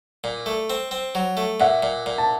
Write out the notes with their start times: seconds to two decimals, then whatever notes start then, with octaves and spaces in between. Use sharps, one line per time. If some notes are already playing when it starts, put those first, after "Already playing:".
0.24 A#2
0.46 A3
0.70 C4
0.91 C4
1.15 F#3
1.37 A3
1.60 A#2 E5 F#5
1.83 A#2
2.06 A#2
2.18 A5